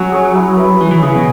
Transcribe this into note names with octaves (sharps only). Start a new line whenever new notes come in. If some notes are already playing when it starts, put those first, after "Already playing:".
Already playing: F#3 C#4
G#4 C#5
E4
B4 E5
E3 C#4
E3
C#3 E4 G#4
B2